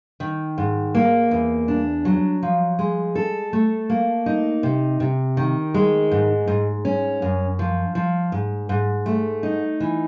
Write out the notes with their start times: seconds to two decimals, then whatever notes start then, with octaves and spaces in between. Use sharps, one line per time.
0.20 D#3
0.58 G#2
0.95 A#3
1.31 E2
1.68 D4
2.05 F#3
2.43 F3
2.79 G#3
3.15 A4
3.53 A3
3.90 A#3
4.26 D#4
4.63 C3
5.00 C3
5.37 D#3
5.74 G#3
6.11 G#2
6.48 G#2
6.85 C#4
7.22 F#2
7.59 F3
7.95 F3
8.32 G#2
8.69 G#2
9.06 A3
9.43 D#4
9.80 E3